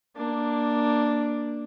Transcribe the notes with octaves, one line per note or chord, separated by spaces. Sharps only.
A#3 D4